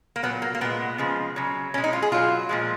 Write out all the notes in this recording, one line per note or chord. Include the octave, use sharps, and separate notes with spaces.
A#3
A#2 F#3 B3
A#3
A#3
A#2 G#3 B3
C#3 F3 G#3
C#3 F#3
B2 G#3 C#4
D#4
F4
G#4
B2 F#3 F4
A#2 F3 G#3